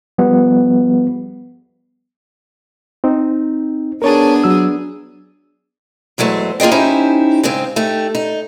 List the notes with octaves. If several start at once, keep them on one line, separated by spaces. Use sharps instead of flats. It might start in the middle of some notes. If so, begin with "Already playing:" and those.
F3 G3 B3
C4 D#4
B3 D4 G#4 A#4 C#5 A5
F#3 E6
E2 F#3 G#3 A3 C5
A#3 F4 G#4 D#5 G5
C#4 D#4 E4 G4 C5
G#2 C#3 G#3 C4
A3 D#4 G4
D#4